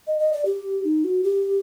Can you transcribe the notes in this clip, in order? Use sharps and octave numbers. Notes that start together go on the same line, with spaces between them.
D#5
D#5
D5
G4
D#4
F#4
G4